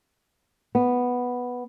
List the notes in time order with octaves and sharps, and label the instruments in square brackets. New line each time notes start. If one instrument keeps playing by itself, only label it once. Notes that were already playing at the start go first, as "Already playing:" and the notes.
[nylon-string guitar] B3